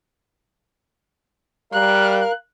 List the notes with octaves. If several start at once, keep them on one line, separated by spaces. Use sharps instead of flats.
G3 A#4 F5 F#6